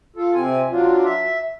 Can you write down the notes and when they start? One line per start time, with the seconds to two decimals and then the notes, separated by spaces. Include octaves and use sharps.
0.16 F4 A4
0.35 C3 C4 G#5
0.70 F#3 D4 F4
1.05 E5